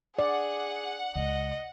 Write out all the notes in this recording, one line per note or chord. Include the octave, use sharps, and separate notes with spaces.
G#4 D5 F#5
C#2 D#5